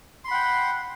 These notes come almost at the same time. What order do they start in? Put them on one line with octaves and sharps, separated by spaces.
C6 B5 F#5 G5